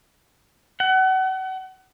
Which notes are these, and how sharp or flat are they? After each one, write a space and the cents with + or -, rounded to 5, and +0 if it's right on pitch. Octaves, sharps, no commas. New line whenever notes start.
F#5 +35